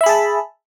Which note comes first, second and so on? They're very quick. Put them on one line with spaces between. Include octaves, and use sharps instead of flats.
E5 B5 G#4 A5